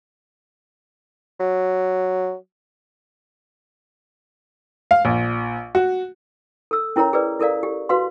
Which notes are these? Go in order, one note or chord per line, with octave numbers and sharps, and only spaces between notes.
F#3
F5
A#1
F#4
A4 E6
C#4 E4 A#4 C#5 A#5
G#4 A#4 B4 D5
E4 A4 A#4 D5 F5
G4
F#4 B4 F5 C6